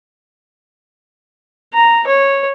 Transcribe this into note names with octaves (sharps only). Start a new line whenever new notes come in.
A#5
C#5